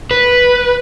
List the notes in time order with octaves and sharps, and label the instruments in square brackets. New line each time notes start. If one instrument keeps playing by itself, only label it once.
[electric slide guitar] B4